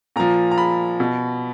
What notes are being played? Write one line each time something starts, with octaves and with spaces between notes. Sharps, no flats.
A#2 F3 A#5
A#5
B5
B2